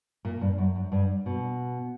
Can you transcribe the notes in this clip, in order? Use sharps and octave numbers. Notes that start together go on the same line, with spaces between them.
A#2
G2
F#2
F#2
G2
B2